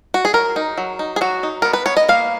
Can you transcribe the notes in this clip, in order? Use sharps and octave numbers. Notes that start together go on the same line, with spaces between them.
F#4
G#4
F#3 A#4
D#4
F#3
D#4
G#4
F#3 F#4
D#4
B3 A#4
B4
B3 C#5
D#5
A#3 F5